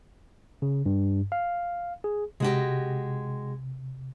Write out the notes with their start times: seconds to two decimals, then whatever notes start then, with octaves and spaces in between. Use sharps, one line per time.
0.62 C#3
0.86 G2
1.32 F5
2.04 G#4
2.40 C3 G#3 F#4 G4